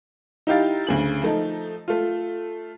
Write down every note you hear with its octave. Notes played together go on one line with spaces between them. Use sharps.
D#4 E4 G4 F5 A6
D2 C#3 F#7
F3 A3 D#4
A3 F4